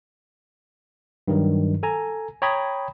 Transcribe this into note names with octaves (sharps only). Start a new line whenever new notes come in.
G2 D#3 F#3
A4 G#5 A#5
C#5 G5 A#5 B5 D#6 G#6